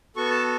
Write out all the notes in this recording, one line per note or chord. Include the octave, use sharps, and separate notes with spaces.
B3 F#4 A4 C#6
A5